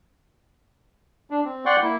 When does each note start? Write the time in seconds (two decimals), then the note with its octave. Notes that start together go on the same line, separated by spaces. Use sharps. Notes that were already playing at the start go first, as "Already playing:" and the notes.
1.30 D4
1.45 C4
1.66 D5 F#5 G5 C6 C#6
1.82 A#3 E4